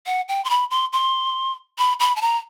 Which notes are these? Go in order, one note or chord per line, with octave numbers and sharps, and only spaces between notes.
F#5
G5
C6
B5
C6
C6
B5
B5
A5
A#5